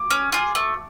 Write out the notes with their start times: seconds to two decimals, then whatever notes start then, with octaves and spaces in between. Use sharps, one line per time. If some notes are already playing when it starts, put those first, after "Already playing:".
Already playing: D6
0.11 C#4
0.32 F4 G#4
0.55 A3